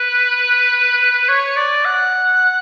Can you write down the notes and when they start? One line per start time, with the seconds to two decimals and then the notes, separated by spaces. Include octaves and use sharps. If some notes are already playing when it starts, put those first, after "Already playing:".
Already playing: B4
1.28 C#5
1.56 D5
1.85 F#5